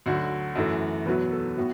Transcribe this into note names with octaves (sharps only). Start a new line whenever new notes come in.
D2 D3 F#3 F#4
F#2 E3 A3
E2 B2 F#3 B4
A4
A2 F#3 B3 F#4